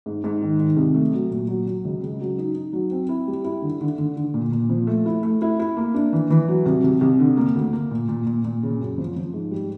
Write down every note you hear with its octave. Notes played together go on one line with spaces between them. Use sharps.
G#2
G#2
D#3
D#3
C2
A3
F#3
A#2
F#3
F#3
C#2
C#3
F#3
D#4
D#4
F#3
C4
E4
G3
E4
D3
D3
D3
D3
A#2
A#2
F3
A3
E4
A3
E4
E4
A#3
D4
E3
E3
F#3
C2
C2
C2
D3
A#3
D2
A#3
A#2
A#2
A#2
A#2
C#3
F#2
F3
F3
G#2
G3